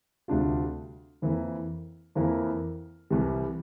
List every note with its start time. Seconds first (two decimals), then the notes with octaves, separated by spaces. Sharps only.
0.28 D2 C3 G3 D4 F4
1.22 F2 E3 A#3 E4 A#4
2.15 F2 E3 A#3 E4 A#4
3.10 C2 C3 E3 G3